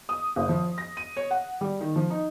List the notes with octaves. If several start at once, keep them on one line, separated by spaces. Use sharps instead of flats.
D#6
F#1
F3
A#6
D#7
C#5
F#5
G3
D#3
F3
D#4